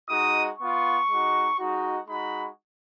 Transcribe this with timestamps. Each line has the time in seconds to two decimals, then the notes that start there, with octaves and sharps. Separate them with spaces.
0.09 G#3 D#4 F#4 D#6
0.59 B3 F4 C#6
1.09 G#3 D#4 F#4
1.58 G#3 D#4 F#4
2.08 G#3 D#4 F#4 B5